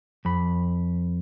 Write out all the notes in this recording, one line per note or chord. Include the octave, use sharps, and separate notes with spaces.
F2 B5